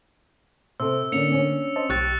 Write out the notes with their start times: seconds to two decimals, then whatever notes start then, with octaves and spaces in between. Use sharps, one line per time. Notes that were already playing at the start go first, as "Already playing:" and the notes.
0.80 C3 A4 C5 E6
1.12 D3 A#3 C#4 D4 C#7 F7
1.31 C#4 D4 C#5
1.76 C5 D#5 A5
1.90 B1 G4 C#6 F#6 A6